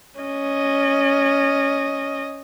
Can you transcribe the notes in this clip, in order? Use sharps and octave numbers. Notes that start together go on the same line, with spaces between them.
C#4 D#5